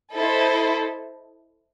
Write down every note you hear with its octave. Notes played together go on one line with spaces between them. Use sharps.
E4 A4 C5 D#5